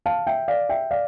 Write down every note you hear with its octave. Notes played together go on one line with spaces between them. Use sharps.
F5 A5
E5 G5
D5 F5
E5 G5
D5 F5